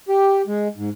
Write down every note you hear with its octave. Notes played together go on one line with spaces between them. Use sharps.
G4
G#3
G#2